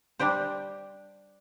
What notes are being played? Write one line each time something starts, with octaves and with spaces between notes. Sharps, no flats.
G3 D4 G4 C5